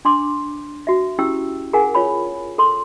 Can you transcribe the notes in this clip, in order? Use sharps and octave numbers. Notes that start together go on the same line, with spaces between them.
D4 C6 D6
F#4 E5
C#4 E4 G4 G5 E6
G#4 A#4 F5 F#5 G#5
F4 C#5 B5
A4 C6